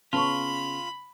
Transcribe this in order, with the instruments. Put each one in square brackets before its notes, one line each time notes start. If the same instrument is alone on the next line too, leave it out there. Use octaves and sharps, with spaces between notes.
[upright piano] C#3 B3 C#4 [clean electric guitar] F4 [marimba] A5 C#6 [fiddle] B5